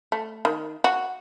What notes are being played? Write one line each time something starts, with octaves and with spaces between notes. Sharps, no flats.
A3
D#3
F#4